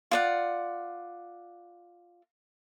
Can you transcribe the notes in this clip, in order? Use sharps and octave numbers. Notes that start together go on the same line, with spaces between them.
F4 D5 F#5